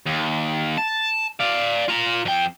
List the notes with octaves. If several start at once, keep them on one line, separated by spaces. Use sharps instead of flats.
D#2
A5
D5 F5
F4 A#5
F2 G5